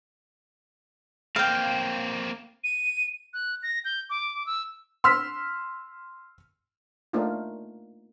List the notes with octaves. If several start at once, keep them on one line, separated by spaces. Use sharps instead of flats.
A#3 C4 F5 G5
D#7
F#6
A#6
G6
D6
E6
C6 E6 F6 B6
A3 A#3 D4 D#4 F4